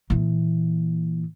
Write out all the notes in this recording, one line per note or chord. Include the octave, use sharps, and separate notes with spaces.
A#2 E3